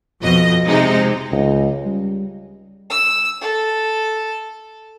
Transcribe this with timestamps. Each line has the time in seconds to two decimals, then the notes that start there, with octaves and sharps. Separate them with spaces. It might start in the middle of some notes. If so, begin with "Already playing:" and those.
0.22 F2 B2 D#5
0.66 C3 G#3 D#4
1.32 C#2
1.85 G3
2.90 E6
3.41 A4